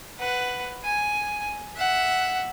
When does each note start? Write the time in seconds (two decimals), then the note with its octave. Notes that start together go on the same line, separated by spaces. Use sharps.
0.18 B4 F#5
0.84 G#5
1.76 E5 F#5